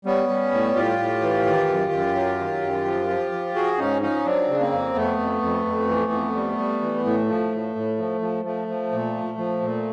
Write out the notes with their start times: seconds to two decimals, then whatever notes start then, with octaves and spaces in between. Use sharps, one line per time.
0.05 G3 B3 C#4
0.29 G3
0.52 A2
0.75 A2 F4 G4
0.99 A2
1.22 E3
1.46 D#3
1.68 F#2
1.92 F#2
2.15 F#3
2.39 D#3
2.61 F#2
2.85 F3
3.09 F3
3.32 F3
3.55 F3 F#4 G#4
3.78 G#2 C#4 D#4
4.02 F3 C#4 D#4
4.25 F#3 C4 D4
4.48 C#3
4.60 A#3 C4
4.71 F2
4.95 F2 A3 B3
5.19 F2
5.42 F2
5.65 F2
5.88 E3
6.12 F2
6.35 G3
6.58 G3
6.81 E3
7.05 A2 A3
7.29 F3
7.51 A2
7.75 A2
7.99 F3
8.21 F3
8.45 F3 A3
8.68 F3
8.92 A#2
9.15 F3
9.38 F3
9.62 A#2